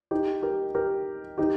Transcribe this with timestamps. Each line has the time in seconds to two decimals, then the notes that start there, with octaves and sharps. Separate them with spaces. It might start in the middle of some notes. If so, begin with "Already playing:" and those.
0.11 D#4 G4
0.42 G4 A#4
0.75 G4 A#4
1.38 D#4 G4